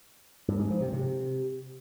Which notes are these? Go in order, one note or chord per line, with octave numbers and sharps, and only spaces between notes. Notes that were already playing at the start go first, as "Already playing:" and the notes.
G2
G#2
F3
C3
C3